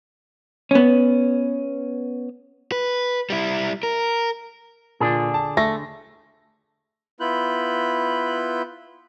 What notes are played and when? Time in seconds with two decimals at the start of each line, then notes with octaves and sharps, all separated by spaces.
0.71 B3 C#4
2.72 B4
3.30 G3 E4
3.83 A#4
5.00 A#2 D3 D4 G#4
5.34 A5
5.57 A3 A#6
7.20 B3 E4 F4 B5 F#6 G6